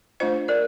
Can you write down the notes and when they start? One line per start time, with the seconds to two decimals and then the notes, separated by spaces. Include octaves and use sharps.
0.20 A3 D4 F4 C5 D#5
0.48 A#4 D5